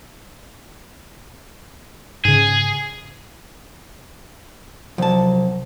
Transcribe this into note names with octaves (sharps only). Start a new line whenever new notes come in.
G#2 C#3 G#4
C2 F3 F#3 A5